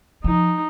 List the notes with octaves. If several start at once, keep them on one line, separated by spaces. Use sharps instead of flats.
F3 D#4